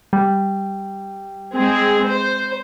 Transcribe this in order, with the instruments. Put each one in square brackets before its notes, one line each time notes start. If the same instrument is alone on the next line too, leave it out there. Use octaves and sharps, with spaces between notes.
[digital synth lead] G3
[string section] G#3 C4 G#4
C5